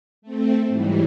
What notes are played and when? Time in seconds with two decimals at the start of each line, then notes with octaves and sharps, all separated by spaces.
0.22 A3 C4
0.68 G#2 E3 F#3 G3